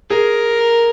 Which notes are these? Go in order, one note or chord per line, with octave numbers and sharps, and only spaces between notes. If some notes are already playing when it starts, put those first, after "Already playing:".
G#4 A#4